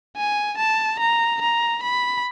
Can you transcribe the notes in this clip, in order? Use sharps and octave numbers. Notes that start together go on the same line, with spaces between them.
G#5
A5
A#5
A#5
B5